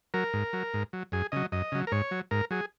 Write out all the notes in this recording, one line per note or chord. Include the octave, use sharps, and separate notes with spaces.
F#3 A#4
G#2
F#3
G#2
F#3
F#2 G#4
C#3 F#3 D#5
F#2 D#5
C#3 F#3
A#4
G#2 C#5
F#3
G#2 A#4
F#3 G#4